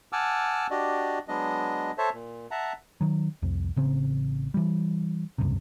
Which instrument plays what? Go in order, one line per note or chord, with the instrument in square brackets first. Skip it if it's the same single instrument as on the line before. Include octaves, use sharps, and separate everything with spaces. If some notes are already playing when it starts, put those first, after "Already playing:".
[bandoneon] F#5 G#5 A5 D6 E6 F6
D4 F#4 G4 D5 D#5
F#3 G#3 B3 D4 D#5
A4 C5 C#5 E5 A5
A#2
E5 F#5 A5 A#5
[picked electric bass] D#3 F#3
C2 F2
A1 C#3 C4
E3 G3
F1 C#2 G2 C3